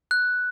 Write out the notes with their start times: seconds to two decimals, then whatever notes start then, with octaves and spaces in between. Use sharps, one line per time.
0.11 F#6